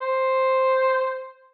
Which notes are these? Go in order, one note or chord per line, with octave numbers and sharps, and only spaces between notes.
C5